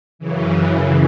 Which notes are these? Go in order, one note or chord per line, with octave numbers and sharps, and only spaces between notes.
F#2 C#3 E3